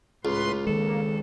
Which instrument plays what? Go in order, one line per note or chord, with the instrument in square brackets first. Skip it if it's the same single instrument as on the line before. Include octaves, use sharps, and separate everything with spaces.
[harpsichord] C#2 [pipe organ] A2 B4 C6 [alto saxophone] F4
[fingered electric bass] D#3 G#3 [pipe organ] A#3 [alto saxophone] A4